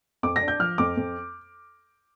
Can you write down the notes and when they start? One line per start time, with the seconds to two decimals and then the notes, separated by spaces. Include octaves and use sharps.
0.23 F2 D6
0.36 A#6
0.42 D4
0.48 G6
0.60 F3 F6
0.78 F2 D6
0.97 F2